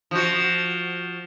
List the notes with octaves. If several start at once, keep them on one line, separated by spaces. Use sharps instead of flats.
F3 F#4